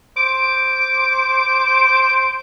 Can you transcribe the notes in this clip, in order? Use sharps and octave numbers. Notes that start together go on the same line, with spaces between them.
C5 D6